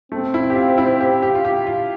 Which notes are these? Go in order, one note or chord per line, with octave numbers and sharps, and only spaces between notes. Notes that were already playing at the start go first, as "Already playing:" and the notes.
A3 C4
E4
G4
F4
E4
G4
G4
F4
G4
F4